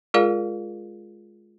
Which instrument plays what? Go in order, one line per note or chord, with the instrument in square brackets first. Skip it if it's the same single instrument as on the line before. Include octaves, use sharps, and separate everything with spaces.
[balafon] G#3 F4 G#4 A#4 D5 F5